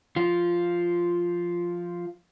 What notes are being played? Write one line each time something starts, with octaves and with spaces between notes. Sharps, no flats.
F3 F4